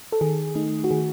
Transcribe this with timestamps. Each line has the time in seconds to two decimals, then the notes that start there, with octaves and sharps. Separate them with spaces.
0.12 A4
0.21 D#3 G#4
0.55 A3 D#4
0.84 F#4
0.91 D#3 G#4